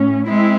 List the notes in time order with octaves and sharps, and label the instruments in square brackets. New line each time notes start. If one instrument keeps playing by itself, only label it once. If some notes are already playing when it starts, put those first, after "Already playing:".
Already playing: [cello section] A2 C#4
[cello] G#3 [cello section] C4 E4